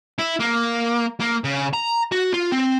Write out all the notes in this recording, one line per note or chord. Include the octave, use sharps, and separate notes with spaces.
E4
A#3
A#3
C#3
A#5
F#4
F4
C4